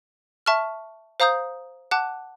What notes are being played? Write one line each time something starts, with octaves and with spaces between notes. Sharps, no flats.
E5 A5 C#6 F6
C5 F5 A#5 D#6 G6
F#5 A5 D6 F#6